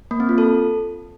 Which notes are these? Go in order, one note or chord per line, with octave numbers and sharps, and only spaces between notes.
A#3
C4
F4
A4